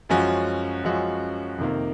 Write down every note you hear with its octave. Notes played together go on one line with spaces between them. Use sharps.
F#2 F3 G#3 C#4 F#4
F#2 F3 G#3 C#4 F#4
F2 C3 D#3 A#3